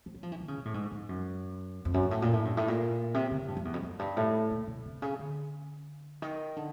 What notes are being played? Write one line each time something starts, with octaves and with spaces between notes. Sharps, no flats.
F3
F#3
F3
E3
D#3
C#3
B2
A2
G#2
G#2
F#2
F2
F#2
G#2
A2
A#2
A2
G2
A2
A#2
C3
C#3
G2
F2
E2
F2
F#2
G2
A2
A#2
B2
C3
C#3
D3
D#3
D3